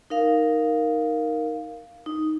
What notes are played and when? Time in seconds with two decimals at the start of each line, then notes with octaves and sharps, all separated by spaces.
0.10 D#4 A#4 F5
2.06 D#4